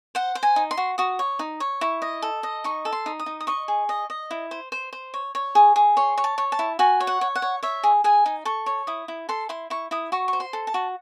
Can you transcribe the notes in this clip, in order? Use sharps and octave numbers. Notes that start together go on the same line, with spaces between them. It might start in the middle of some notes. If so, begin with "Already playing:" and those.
C5 F#5
C5
G#5
D#4
C6
F#4
F#4 D#6
C#5
D#4
C#5
E4 C#6
D#5
A4
D#5
D#4 C#6
A4
C6
D#4
D#6
D#4
D#6
D#5 C#6
G#4
D#5
D#5
E4
C5
C5
C5
C#5
C#5
G#4
G#4
C#5 C6
C#5
A5
C#5
A5
E4
F#4 G#5
C#5
F#5
C#5
F#5
C#5
C#5 E5
G#4
G#4 G#5
D#4
A4 C#6
C#5
E4 D#6
E4
A4 C6
E4 C6
E4 C#6
E4 D#6
F#4 C#6
C#6
C5
C6
A4
A5
F#4